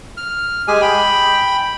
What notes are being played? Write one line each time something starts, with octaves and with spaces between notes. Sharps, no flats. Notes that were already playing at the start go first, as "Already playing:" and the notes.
F6
G#3 G4 G#4 G#5
G5 B5